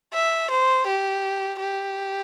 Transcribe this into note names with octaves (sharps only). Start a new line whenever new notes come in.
E5
C5
G4
G4